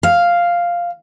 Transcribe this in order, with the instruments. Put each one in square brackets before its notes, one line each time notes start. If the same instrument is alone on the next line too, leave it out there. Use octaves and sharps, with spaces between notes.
[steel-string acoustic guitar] F5